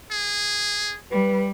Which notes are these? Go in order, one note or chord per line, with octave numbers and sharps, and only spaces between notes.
G#4
G3 B4